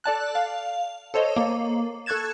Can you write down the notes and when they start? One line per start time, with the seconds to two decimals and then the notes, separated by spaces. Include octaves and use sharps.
0.04 A4 D5 A5 F#6
0.35 F5
1.14 A4 C5 C#5 D#5
1.36 A#3
2.06 A4 C#6 F#6 G#6 A6 E7